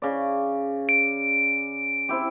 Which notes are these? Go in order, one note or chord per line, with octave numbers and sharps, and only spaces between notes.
C#3 D5
D7
C4 E4 G4